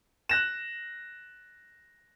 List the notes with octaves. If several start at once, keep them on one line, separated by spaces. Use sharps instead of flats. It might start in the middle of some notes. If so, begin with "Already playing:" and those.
F#6 A#6 E7